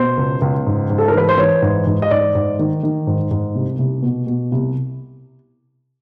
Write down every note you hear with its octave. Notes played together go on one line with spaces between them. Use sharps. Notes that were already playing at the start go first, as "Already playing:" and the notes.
Already playing: B2 C5
C#2
C#2
G#2
G#2
A4
A#4
E3 B4
C5
E3 C#5
G#2
G#2
D#5
G#2 D5
G#2
D#3
D#3
G#2
G#2
C2
C2
B2
B2
C2